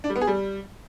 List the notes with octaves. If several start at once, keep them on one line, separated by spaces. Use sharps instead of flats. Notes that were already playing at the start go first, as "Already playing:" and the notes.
D4
G3
B3
G#4
G3